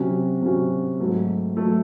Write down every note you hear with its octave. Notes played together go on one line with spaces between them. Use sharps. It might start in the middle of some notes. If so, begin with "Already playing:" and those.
Already playing: C3 F#3 C#4 F#4
C3 F#3 C#4 F#4
G#2 F#3 A3
F#3 A3